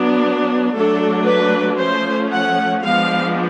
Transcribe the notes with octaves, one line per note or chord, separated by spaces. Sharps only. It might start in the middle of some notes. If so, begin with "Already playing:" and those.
Already playing: F#3 B3 D4
F#3 A3 D4 A4
B4
F3 A3 C#4 C5
F#5
F3 G#3 B3 D4 F5